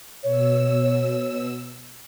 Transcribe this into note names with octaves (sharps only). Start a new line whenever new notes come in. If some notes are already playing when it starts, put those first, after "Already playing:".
B2 C#5 E6